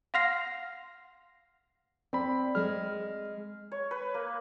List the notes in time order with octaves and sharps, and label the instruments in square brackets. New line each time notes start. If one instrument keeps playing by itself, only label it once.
[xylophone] F5 F#5 C6 F6 A#6 C7
[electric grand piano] C4 B5 [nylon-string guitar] D5
[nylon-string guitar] G#3 G#4 [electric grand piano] F6
[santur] C#5
B4
A#3